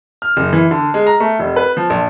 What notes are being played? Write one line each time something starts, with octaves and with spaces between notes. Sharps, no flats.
F6
F#1
E3
D3
G#3
A#5
A3
F1
B4
F3
A#1